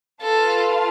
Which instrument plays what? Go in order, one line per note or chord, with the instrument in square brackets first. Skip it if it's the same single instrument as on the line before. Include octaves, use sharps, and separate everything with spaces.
[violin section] F4 B4 F5 A5 [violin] A4